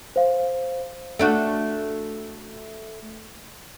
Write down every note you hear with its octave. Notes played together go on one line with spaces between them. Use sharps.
C5 F5
A3 D4 F#4